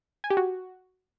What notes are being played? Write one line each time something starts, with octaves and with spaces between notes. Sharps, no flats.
G#5
G4
F#4